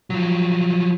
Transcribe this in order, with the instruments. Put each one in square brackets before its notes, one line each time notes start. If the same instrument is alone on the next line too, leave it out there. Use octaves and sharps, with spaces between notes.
[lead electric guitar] F3 F#3